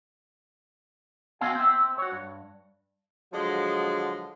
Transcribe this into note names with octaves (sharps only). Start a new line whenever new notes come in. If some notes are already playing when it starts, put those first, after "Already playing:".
B3 C4 F#4 F5 G#5
C4 E5
F#4 C#5
G2
D3 F3 F#3 G#3